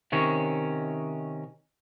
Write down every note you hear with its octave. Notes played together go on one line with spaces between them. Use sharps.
C3 D#3 C#4 C#5